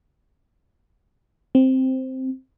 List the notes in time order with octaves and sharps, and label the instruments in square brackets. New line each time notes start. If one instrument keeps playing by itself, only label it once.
[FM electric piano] C4